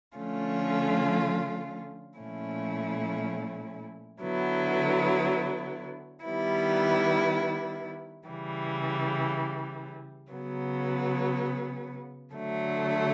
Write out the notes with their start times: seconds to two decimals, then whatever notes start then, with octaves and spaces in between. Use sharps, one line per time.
0.17 D3 F3 A3 C#4 F4
2.19 A#2 F3 A3 C#4 E4
4.22 D3 F#3 B3 E4
6.25 D#3 G3 B3 E4
8.27 C#3 E3 G3
10.31 C#3 F#3 B3
12.33 D3 F#3 A3